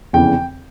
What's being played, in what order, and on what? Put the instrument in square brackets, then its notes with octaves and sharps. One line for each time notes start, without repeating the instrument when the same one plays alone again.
[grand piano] F1 E2 C#3 E3 G5